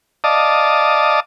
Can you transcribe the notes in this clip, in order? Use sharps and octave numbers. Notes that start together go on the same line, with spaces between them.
D5 D#5 F5 A5 D6 D#6